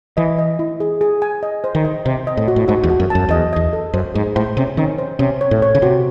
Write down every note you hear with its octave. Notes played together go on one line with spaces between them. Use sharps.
E3 D#5
D#5
E4
G#4
G#4
G#5
D#5
C5
D#3
D#5
C3 C5
D#5
A2
F#4
A2
G#2 F#4
E2
F#4
F#2
F#2 A5
E2 D#5
E2 D#5
A4
F#2 C5
G#2 G#4
A2 C5
C3 C#4
D#3 C#4
C5
C3 C#4
C#5
A2
C#5
C#3
C3 F#4